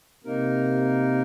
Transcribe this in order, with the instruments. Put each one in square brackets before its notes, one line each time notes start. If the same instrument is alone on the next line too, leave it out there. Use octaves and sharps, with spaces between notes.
[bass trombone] C3 [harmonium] A#3 D#4 A#4